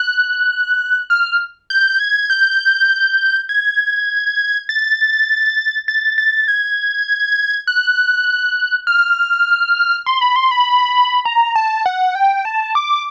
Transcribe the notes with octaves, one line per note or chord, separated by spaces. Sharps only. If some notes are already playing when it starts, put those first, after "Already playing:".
Already playing: F#6
F6
G6
G#6
G6
G#6
A6
A6
A6
G#6
F#6
F6
C6
B5
C6
B5
A#5
A5
F#5
G5
A5
D6